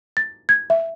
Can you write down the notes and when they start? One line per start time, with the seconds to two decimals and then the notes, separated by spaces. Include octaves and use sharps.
0.17 A6
0.49 G#6
0.70 E5